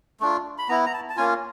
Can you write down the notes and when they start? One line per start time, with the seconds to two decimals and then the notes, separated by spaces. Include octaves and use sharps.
0.20 A3 D4 F4
0.58 B5
0.69 B3 E4 A#5
0.86 A#5
0.93 A5
1.10 A5
1.17 A#3 C#4 F4 G#5